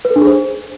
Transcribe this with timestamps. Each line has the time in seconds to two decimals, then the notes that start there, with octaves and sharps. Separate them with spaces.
0.05 B4
0.10 A4
0.16 D4
0.21 G#4
0.27 C5